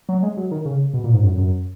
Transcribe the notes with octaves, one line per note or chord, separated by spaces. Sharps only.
F#3
G#3
F#3
D#3
C#3
B2
A#2
G#2
F#2
F#2